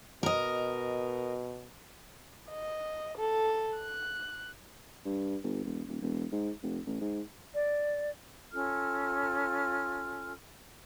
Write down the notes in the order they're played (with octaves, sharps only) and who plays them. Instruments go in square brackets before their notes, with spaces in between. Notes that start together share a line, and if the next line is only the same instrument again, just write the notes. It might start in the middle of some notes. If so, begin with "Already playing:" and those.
[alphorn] B2 [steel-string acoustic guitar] A#4 D#5
[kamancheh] D#5
A4
F#6
[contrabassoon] G2
G1
E1
D#1
E1
G#2
F1
A1
G#2
[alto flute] D5
[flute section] C#4 F4 A4 F6